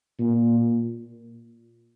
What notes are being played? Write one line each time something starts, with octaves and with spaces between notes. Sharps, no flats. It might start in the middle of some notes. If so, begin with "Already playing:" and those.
A#2